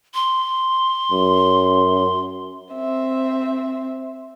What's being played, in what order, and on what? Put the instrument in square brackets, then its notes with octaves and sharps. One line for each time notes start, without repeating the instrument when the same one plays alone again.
[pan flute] C6
[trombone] F#2
[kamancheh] C4 E5